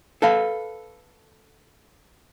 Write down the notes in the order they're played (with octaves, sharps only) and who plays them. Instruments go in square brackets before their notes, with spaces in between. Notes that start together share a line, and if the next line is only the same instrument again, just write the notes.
[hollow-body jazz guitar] A4 B4 F5